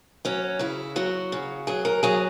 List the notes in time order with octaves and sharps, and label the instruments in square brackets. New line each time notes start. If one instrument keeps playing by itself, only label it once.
[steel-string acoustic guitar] F#3 C#4
C#3 E4
F#3 F#4
C#3
F#3 G#4
A#4
F#3 G#4